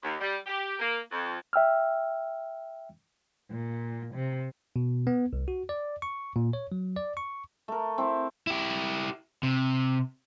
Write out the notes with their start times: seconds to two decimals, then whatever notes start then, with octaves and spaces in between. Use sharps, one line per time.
0.03 D#2
0.21 G3
0.47 G4
0.79 A#3
1.12 F2
1.53 E5 G5 E6 F6
3.50 A#2
4.14 C3
4.76 B2
5.07 B3
5.33 C2
5.48 F#4
5.69 D5
6.02 C#6
6.36 A#2
6.53 C#5
6.72 F#3
6.96 D5
7.17 C#6
7.68 A3 A#4
7.98 C4 E4
8.47 E4 G4
9.43 C3